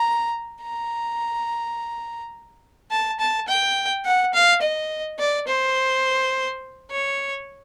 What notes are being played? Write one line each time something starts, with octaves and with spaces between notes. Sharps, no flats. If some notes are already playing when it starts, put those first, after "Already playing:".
Already playing: A#5
A#5
A5
A5
G5
F#5
F5
D#5
D5
C5
C#5